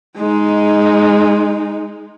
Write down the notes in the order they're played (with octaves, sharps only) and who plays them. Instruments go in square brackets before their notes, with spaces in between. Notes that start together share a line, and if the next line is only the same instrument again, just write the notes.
[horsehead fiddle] G#3 D#4